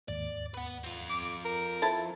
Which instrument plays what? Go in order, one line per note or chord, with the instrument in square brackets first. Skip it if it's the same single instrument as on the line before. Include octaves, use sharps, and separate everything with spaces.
[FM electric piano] D#2 G#2 [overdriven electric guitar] D5
[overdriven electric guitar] B4 F#5
C4 F4
[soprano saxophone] D6
A#4
[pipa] E4 A5 [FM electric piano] A4 C5